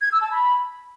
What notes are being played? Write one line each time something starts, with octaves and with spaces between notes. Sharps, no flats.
G#6
E6
A5
B5